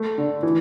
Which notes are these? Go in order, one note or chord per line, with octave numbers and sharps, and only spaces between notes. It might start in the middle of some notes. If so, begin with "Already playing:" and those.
Already playing: A3
D3
E3